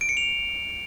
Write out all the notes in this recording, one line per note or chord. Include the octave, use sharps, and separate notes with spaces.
D7
C#7
F7